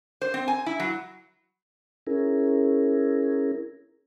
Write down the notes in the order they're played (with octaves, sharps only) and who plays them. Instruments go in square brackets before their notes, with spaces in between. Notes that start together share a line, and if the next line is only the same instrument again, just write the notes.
[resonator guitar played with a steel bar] C5
C4
G#5
E4
F#3
[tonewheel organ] C#4 E4 G#4 A#4